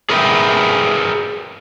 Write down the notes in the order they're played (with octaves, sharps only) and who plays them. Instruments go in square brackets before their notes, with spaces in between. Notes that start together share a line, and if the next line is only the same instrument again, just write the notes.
[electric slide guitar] G#4 A#4 B4 C#5 E5 G5